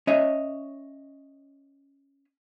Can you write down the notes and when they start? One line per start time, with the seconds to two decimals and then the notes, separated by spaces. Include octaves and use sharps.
0.07 C#4 C#5 D#5 E5